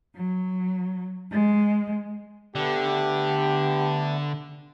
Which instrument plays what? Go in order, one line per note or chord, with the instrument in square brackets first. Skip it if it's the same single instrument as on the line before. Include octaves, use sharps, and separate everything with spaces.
[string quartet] F#3
G#3
[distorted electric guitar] D3 [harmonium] A3 B3 D4 [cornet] G4